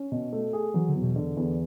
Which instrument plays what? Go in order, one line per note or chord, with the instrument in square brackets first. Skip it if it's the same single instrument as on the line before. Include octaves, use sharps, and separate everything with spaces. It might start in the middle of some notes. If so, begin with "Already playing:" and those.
Already playing: [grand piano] C#4
B2
A3
G#4
[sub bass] E3 [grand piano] F#3
[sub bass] D3
[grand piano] E2
[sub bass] B2
[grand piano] D3
E2